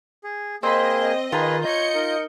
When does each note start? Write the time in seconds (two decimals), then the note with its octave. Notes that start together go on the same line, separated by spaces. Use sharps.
0.24 G#4
0.63 A#3 C4 G#4 C5 D#5 B5
1.32 D#3 F4 G#4 B4 A#5
1.65 C#5 D#5 G6 C#7
1.95 D#4 A#4